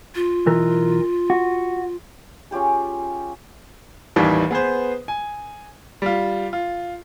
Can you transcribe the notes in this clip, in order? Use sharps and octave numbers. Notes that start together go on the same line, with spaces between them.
F4
B1 E3 A#4
F#4
C#4 F4 G4 G#4
A1 D#2 D#3 E3 G3
B3 G#4 B4 C5
G#5
G3 F4
F4